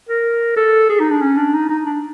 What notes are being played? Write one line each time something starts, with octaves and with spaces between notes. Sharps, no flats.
A#4
A4
G#4
D#4
D4
C#4
D4
D#4
D#4
D4